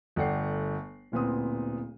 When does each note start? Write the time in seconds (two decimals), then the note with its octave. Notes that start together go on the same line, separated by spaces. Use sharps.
0.16 G1 A3 D5 F#5 G5 C7
1.12 D1 A#2 B3 C4 D#6